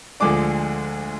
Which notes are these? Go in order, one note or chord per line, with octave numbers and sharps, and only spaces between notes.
D2 D3 F3 G#3 D4 D6